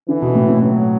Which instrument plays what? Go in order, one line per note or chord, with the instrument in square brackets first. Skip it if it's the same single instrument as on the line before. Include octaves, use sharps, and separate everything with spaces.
[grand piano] D3 [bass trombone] E3
[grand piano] B2
A2
A2
[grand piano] A2 [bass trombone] F#3